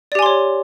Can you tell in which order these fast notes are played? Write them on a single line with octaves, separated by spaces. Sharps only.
D5 G4 G#5 C6 C#5